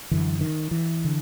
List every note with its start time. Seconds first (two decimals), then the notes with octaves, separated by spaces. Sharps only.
0.11 F#2 D3 E3
0.41 D#3
0.71 E3
1.04 D3